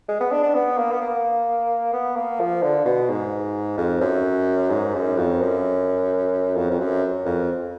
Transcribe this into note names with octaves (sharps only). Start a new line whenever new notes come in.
G#3
B3
D4
D4
B3
A#3
B3
A#3
B3
A#3
F3
D3
B2
G#2
F2
F#2
G#2
F#2
F2
F#2
F2
F2
F#2
F2